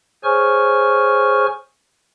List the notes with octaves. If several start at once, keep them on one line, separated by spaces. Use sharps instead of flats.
G#4 C5 C#5 G#5 C#6 F6